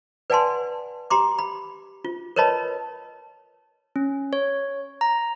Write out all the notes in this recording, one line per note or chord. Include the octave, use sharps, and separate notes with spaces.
B4 D5 F#5 G#5 A5 C6
G4 A#5 C6 D6
B5
F4
A#4 B4 C#5 D#5 A5 B5
C#4
C#5
A#5